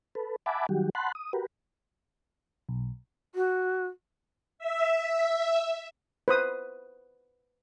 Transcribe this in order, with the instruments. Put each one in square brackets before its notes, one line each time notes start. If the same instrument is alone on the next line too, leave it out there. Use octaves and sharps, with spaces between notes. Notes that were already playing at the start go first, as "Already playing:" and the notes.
[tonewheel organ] A4 B4
E5 F#5 G#5 A5 B5 D6
D#3 F#3 G3 F#4 G4
F#5 A5 B5 C6 F#6
D#6
F#4 G4 A#4 B4
[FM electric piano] B1
[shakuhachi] F#4
[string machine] E5
[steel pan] B4 C5 D#6